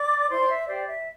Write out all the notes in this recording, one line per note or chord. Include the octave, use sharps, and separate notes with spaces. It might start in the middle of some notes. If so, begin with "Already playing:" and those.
Already playing: D5 D6
E4 C5 C6
D5
E5
G4 C5 D5
E5